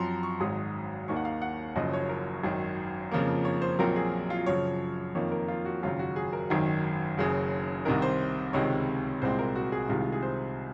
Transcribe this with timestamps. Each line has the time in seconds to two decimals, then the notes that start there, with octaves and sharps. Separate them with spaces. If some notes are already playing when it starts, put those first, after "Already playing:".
Already playing: F#2 F3 C4 A#5 C6
0.23 C#6
0.40 G#1 G#2 F#3 D#6
1.08 D#2 D#3 A#3 C#6
1.16 F#5
1.25 F5
1.42 F#5
1.75 F#1 F#2 C#3 F3 D#5
1.93 C#5
2.09 A#4
2.44 G#1 F#2 D#3
3.11 F2 C#3 F3 A#3
3.45 C#5
3.62 C5
3.79 A#1 A#2 F#3 C4 A#4
3.96 G#4
4.30 F4
4.46 F#2 C#3 F3 C#5
5.15 F2 D#3 A#3 C#5
5.32 A#4
5.48 F4
5.65 F#4
5.83 G#1 F#2 C#3 F#3 F4
5.99 F#4
6.16 G#4
6.33 A#4
6.50 G#1 F#2 D#3 A#4
7.18 F#1 F#2 C#3 G#4
7.85 C2 C3 D#3 A#4
8.02 C5
8.53 C#2 C3 D#3 G#3 C4 C#5
9.22 C2 A#2 G#3 C4 C5
9.39 A#4
9.55 F#4
9.72 G#4
9.89 C2 C3 D#3 G#3 F4
10.01 F4
10.12 G#4
10.22 C5